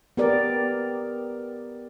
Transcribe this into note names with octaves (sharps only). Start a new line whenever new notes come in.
B3 G4 A#4 D5